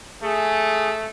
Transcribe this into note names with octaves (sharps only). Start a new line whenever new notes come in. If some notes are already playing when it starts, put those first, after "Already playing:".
A3 G#4